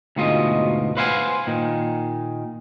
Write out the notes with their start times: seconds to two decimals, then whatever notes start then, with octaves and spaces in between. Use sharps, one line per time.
0.16 D2 G#2 B2 F4 D#5
0.97 B4 C5 F5 F#5 G#5
1.47 A#2 D#3